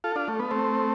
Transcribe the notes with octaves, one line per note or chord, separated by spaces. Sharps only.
F4 A4
D4 F4
A3
B3
A3 C4